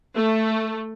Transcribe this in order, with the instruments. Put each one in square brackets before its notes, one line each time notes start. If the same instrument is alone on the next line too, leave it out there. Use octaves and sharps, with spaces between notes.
[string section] A3